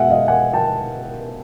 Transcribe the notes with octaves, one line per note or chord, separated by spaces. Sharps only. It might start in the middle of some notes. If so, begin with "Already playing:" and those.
Already playing: B2 G#3 E5 F#5 G#5
D#5 F5
F#5 G#5
G5 A5